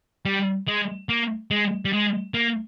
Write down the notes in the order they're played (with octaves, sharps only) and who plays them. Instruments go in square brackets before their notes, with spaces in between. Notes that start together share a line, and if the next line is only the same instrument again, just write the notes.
[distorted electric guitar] G3
G#3
A#3
G#3
G3
G#3
A#3